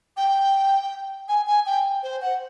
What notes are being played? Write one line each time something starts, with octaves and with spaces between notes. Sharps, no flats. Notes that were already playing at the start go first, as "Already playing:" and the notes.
G5
G#5
G#5
G5
C5
F#5